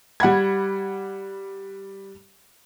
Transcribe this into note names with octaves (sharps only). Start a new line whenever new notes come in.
G3 F#5 B5 G#6